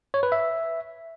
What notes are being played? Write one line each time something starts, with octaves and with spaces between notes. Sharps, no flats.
C#5
B4
E5